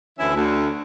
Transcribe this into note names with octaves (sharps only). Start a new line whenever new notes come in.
D2 E3 C#4 E4 E5
D2